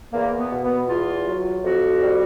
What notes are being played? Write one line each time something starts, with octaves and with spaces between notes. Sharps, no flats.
E2 A#3
B3
B2
B3
E2 F4
F#3
F2 F#4
G3